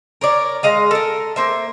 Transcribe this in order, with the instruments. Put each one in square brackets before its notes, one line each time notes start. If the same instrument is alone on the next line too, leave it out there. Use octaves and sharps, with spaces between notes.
[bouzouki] A#4 C#5 D5
G#3 D#5 F5
A4 A#4
A#3 C5 E5